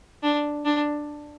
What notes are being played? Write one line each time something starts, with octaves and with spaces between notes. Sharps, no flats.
D4
D4